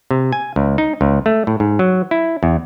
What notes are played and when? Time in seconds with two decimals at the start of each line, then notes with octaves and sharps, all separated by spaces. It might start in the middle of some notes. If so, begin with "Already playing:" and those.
0.11 C3
0.32 G#5
0.56 C#2
0.78 D#4
1.01 C#2
1.26 A3
1.47 A2
1.60 G#2
1.79 F#3
2.11 E4
2.43 E2